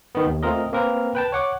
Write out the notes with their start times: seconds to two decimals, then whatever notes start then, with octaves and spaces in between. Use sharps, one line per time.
0.15 D#3 B3
0.26 D#2
0.43 A3 C4 F4 A#4 D#5
0.73 A#3 C4 A#4 B4
1.15 B4 G5 A5
1.32 C#5 F#5 D6